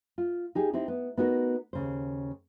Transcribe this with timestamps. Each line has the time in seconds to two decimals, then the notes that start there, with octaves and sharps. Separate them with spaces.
0.18 F4
0.55 D#4 G4 G#4
0.73 C4 D#4 E4 G4
0.88 B3
1.17 B3 D#4 F#4 A#4
1.73 D#2 C#3 C5